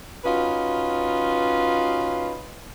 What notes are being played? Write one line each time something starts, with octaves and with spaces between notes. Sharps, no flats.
C#4 D#4 F4 F#4 B4